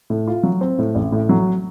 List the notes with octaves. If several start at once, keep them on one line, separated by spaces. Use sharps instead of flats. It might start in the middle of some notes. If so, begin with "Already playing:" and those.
A2
F4
F#3
C4
A2
A1
A2
F#3